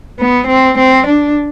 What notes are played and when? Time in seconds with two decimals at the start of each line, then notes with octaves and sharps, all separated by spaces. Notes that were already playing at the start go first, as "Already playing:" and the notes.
0.19 B3
0.48 C4
0.77 C4
1.06 D4